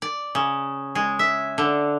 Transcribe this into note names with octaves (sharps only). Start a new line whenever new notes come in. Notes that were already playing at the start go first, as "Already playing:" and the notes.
D5
C#3
G#3
E5
D3